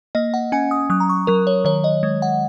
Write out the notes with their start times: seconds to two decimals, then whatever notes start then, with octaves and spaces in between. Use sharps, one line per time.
0.15 A#3 D#5
0.34 F#5
0.52 C#4 G#5
0.71 D#6
0.90 F#3 D#6
1.00 A#5
1.09 C#6
1.27 F#3 A#4
1.47 C#5
1.65 D#3 C#5
1.84 D#5
2.03 G#3
2.22 F#5